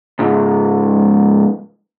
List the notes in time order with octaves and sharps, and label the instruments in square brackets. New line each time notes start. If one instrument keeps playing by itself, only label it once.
[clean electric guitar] C#2 G#2